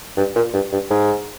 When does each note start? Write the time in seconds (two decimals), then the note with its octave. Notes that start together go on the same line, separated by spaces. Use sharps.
0.17 G2
0.36 A#2
0.54 G2
0.72 G2
0.91 G#2